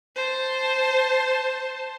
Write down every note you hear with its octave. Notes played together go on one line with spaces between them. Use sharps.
C5 A5